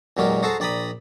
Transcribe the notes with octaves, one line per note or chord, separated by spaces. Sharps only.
E2 A#2 F#3 G#3 G4 A#4
F#4 G#4 A4 C5 A5 A#5
A#1 D5 G5 A#5 B5 D#6